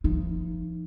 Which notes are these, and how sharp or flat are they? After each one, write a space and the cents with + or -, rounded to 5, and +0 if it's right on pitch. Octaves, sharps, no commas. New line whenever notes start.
F3 -40 D#4 +0